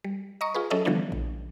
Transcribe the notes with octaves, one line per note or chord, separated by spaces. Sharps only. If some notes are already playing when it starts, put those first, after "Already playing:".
G3
D#5 A#5 C#6 D#6
F4 G#4 B4
F#3 C#4 A4 D#5 E5
D3 E3 F3 G3 B3 D4
A#1